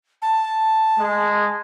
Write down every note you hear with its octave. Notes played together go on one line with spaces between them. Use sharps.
A5
G#3